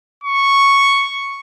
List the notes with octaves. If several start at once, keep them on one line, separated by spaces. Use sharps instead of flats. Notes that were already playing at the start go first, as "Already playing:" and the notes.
C#6